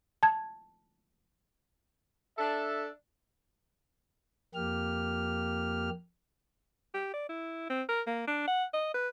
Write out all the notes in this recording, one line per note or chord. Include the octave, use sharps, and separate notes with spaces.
A5 G#6
D4 A4 E5
F2 A#3 G4 F6
G4
D5
E4
C4
A#4
A#3
D4
F#5
D#5
B4